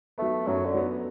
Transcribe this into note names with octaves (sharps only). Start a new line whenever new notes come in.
F#3 A3 B3
F#2 F#3
D3
F#3 B3